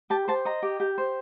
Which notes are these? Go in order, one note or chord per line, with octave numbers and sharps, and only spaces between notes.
G4 A5
C5 A5
D#5 A#5
G4
G4
C5